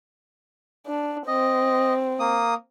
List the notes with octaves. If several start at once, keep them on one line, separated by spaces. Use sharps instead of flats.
D4
C4 D#5
A#3 D#6